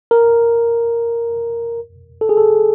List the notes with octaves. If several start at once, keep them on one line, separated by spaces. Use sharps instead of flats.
A#4
A4
G#4
A4